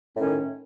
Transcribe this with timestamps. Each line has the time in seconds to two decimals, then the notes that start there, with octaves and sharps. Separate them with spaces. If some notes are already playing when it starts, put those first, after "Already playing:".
0.15 A2
0.18 C#4
0.21 D#3